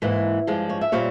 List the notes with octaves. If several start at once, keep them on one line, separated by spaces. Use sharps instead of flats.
G#2 E3 A#3
G2 F3 G#3
C#5
E5
A#2 G3 C4 C#5 F5